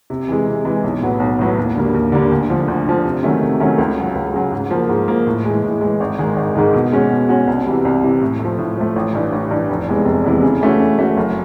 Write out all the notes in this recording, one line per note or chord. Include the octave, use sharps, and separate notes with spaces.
C3
E3 G#3
C3
E3 G#3
B1
A2 F#3 B3
B1
A2 F#3 B3
D#2
D3 G3 A#3
D#2
D3 G3 A#3
D2
D3 F3
D2
D3 F3
C3
D#3 F#3 A3 C#4
C3
D#3 F#3 A3 C#4
C#2
C#3 F#3
C#2
C#3 F#3
G#2
F3 A#3
G#2
F3 A#3
A2
E3 G#3
A2
E3 G#3
G#1
G#2 D#3 G#3
G#1
G#2 D#3 G#3
B2
G#3 C#4 F#4
B2
G#3 C#4 F#4
C2
C3 E3 G3
C2
C3 E3 G3
A2
A3
F3
A2
F3 A3
A1
G2 E3
A1
G2 E3
F1
E2 C3 E3 G#3
F1
E2 C3 E3 G#3
C#3
E3 A3 C#4 F#4
C#3
E3 A3 C#4 F#4
F#1